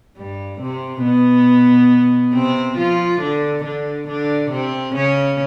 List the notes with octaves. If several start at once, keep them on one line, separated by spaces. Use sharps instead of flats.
G2 G3
C3 C4
B2 B3
C3 C4
F3 F4
D3 D4
D3 D4
D3 D4
C3 C4
C#3 C#4